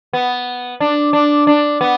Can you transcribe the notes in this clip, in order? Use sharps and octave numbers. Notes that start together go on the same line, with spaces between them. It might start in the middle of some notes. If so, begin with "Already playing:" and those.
B3
D4
D4
D4
B3